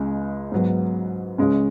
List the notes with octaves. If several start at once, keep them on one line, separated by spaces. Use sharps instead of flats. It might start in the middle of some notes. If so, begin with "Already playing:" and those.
Already playing: C#2 C#3 G#3
G#2 F#3 B3
C#2 C#3 G#3 C#4